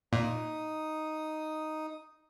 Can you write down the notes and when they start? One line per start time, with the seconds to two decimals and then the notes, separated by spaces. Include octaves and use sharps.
0.13 A#2 D#4 D#6